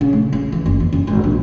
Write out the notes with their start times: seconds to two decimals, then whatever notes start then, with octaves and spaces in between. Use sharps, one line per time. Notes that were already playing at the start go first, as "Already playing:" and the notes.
0.01 C#3
0.13 A3
0.32 C#3
0.52 E3
0.66 F#1
0.80 E2
0.92 C#3
1.07 G#1
1.24 A#1